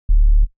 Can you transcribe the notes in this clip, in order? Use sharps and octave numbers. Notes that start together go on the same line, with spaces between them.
D1